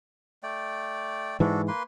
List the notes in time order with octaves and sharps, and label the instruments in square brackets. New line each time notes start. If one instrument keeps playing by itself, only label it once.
[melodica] A3 D5 G5
[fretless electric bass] G#2 E3 [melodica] D4 F#4 A4
[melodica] A#3 B4 C6